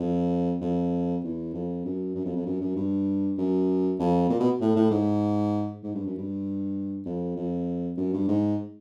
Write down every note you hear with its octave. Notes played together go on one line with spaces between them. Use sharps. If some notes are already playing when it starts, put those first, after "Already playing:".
Already playing: F2
F2
E2
F2
F#2
F#2
F2
F2
F#2
F#2
G2
F#2
F2
A#2
B2
A2
A2
G#2
G#2
G2
F#2
G2
F2
F2
F#2
G2
G#2